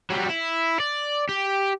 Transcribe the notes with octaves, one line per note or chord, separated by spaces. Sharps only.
F#3 G3
E4
D5
G4